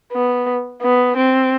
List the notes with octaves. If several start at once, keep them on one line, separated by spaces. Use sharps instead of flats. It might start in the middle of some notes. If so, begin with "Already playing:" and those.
B3
B3
C4